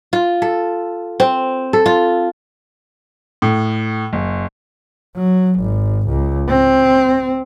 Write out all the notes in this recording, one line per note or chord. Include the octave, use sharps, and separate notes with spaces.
F4
A4
C4
A4
F4
A2
F#1
F#3
G#1
C#2
C4